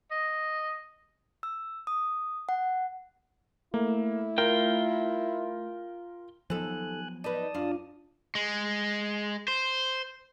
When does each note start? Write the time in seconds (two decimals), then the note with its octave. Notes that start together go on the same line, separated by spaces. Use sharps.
0.11 D#5
1.43 E6
1.87 D#6
2.49 F#5
3.74 A3 A#3 E4
4.38 F4 A#4 G5
6.50 D#2 F3 F#3 B3 A4 G#5 F#6
7.24 D#4 B4 D5 A5 D#6
7.55 F#2 D4 F4 F5
8.35 G#3
9.48 C5